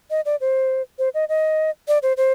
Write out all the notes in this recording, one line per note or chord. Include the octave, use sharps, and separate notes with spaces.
D#5
D5
C5
C5
D#5
D#5
D5
C5
C5